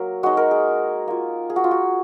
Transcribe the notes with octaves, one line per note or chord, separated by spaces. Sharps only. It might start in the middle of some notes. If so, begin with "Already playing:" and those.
Already playing: F#3 A#3 A#4
G#3 D#4 F#4
A#4
G#4
A#3 F4
G#4
F#4
F4
F#4